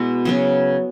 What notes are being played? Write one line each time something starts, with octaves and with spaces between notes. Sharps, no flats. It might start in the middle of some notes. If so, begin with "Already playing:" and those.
Already playing: B2 G#3 B3 E4 F#4 B4
C#3 F#3 B3